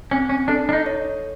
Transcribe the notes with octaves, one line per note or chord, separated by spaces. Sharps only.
C4 C#4
C#4
D4 A4
D4
D#4
C#5